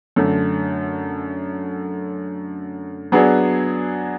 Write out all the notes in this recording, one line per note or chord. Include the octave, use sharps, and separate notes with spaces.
F#2 D3 A3
F#3 B3 D4 G#4